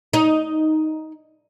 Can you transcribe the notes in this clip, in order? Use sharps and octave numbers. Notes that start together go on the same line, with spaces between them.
D#4